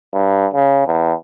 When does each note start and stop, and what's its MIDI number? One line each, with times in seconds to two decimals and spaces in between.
0.13 0.47 43
0.54 0.82 49
0.87 1.13 40